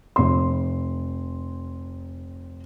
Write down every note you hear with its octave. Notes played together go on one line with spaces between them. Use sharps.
F1 C6